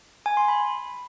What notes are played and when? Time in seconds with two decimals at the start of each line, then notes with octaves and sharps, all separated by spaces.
0.26 G#5
0.37 C6
0.48 B5